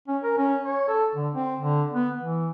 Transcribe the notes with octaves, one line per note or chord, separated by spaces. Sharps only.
C#4
A#4
C#4
C#5
A4
D3
C4
D3
B3
E3